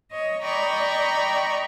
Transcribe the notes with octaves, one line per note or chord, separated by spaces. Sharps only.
C#5 D#5
D5 D#5 G5 A#5 B5 C#6